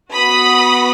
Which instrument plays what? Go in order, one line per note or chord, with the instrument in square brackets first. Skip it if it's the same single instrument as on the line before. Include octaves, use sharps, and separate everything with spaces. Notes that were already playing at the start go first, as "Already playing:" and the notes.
[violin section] B3 F#4 B5 D#6